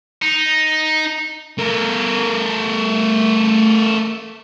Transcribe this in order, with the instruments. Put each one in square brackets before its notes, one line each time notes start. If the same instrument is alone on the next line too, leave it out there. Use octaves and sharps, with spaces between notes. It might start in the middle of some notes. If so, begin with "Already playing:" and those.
[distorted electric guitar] D#4
A3 A#4